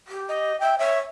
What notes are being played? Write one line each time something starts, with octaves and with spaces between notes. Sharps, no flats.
G4
D#5
E5 G5
C#5 E5